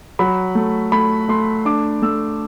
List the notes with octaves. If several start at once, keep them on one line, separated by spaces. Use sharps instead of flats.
F#3 B5
A3
A3 B5
A3 C6
D4 D6
A3 E6